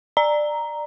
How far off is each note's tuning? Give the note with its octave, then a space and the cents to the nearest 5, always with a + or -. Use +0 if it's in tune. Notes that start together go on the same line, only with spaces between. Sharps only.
D5 +20 A#5 +0